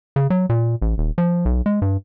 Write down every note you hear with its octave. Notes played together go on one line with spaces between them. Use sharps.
C#3
F#3
A#2
A1
D#1
F3
B1
G#3
G2